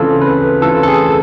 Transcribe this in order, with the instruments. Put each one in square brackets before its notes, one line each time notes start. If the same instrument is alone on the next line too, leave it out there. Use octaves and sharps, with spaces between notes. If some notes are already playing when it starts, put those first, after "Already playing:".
Already playing: [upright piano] C#3 E3 A3 C4 F4 [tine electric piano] A4
[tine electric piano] B4
[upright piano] C#3 E3 A3 C4 F4 [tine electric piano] A4
[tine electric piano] A4
G#4